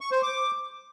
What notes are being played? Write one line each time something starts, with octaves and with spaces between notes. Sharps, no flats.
C#6
C5
D6